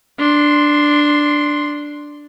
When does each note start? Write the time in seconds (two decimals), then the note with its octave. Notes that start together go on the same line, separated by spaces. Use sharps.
0.19 D4 C6